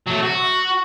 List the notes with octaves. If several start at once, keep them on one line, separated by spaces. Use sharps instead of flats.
F#3 A3
F#4